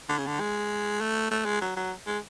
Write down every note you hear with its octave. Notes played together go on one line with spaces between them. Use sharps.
D3
C#3
D3
G#3
A3
A3
G#3
F#3
F#3
G#3